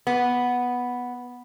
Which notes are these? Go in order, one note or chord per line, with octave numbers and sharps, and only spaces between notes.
B3